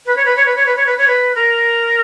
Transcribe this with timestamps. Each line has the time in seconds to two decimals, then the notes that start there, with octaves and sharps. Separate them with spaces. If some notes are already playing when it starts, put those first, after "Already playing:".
0.06 B4
0.16 C#5
0.25 B4
0.37 C#5
0.46 B4
0.56 C#5
0.66 B4
0.76 C#5
0.86 B4
0.98 C#5
1.08 B4
1.35 A#4